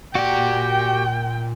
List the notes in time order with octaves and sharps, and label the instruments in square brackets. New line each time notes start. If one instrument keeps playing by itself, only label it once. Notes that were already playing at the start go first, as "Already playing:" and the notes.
[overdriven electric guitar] A#2 D5 [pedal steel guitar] F#4 G4 [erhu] G5